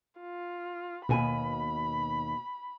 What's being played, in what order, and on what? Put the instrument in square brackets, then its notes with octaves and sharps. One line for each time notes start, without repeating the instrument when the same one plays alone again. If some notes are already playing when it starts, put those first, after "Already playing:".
[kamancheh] F4
[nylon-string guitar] D#2 G#5 [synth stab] B2 [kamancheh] B5